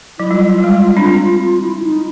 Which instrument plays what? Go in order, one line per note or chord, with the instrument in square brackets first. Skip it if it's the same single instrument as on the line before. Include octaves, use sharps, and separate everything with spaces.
[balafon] F#3 [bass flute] E4
[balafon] G3 [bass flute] F4
[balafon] G3
G#3
C4 D4
[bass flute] E4
E4
D#4